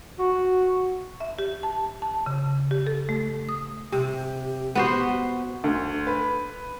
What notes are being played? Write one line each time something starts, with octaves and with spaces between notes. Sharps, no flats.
F#4
E5
G4
A5
A5
C#3
G4
A4
A3
D#6
C3 G4
B3 F#4 C5
D2
B4